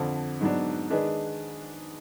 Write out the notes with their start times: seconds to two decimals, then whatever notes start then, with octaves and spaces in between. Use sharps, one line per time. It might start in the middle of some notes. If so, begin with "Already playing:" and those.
Already playing: F2 D3 F3
0.40 G#2 F#3 B3 D4
0.90 D#3 G#3 D4 G#4 B4